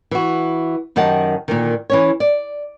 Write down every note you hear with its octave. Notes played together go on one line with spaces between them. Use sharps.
E3 F#4
F#2 D#3 G4 D#5 F#5 A5
A#2 D3 D#3
E3 C#4 C#5
D5